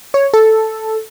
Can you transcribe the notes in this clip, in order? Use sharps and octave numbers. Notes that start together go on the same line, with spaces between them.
C#5
A4